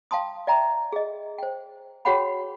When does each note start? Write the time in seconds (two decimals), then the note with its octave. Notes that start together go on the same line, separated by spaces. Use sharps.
0.11 F5 G5 A5 C6 D#6
0.47 D5 E5 G5 A#5
0.92 G#4 D#5
1.38 C5 G5
2.05 F#4 G#4 C#5 F#5 G5 B5